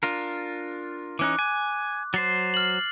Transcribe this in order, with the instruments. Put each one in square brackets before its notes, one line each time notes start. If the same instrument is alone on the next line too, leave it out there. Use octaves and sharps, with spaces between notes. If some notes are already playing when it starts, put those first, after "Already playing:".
[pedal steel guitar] D4 F4 A#4
[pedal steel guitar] E3 C#4 D#4 [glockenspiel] D6 F#6
[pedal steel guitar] G#5
[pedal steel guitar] F#3 C5 [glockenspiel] A6 C7
[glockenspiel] F6 F#7